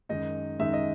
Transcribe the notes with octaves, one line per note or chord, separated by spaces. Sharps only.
F#2 D#3 G#3 D#4 D#5
F#2 D#3 G#3 D#4 E5
D#5